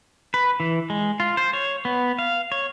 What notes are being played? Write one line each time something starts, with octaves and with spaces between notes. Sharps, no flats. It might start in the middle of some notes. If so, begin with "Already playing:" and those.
B4
E3
G#3
F4
C5
C#5
B3
F5
C#5